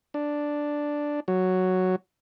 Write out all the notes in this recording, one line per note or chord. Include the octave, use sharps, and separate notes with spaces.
D4
F#3